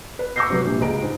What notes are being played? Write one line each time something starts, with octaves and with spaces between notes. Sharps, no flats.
B4
C#6 D6 E6 G6 A#6 C7
C3 F#3 B4
A#1 A#2 D3 G3
C#2 G#4 A#5 D7
G#2